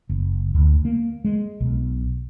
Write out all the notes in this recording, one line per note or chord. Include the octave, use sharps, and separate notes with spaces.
F#1
D2
A#3
G#3
B1